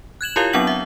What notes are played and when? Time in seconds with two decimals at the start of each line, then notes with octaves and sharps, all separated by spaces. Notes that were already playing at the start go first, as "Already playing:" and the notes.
0.21 F#6 G#6 E7 F#7
0.36 E4 F4 G4 A#4 C#5 F5
0.53 F#3 B3 C4 D4 F#5 F#7
0.67 E5 F#5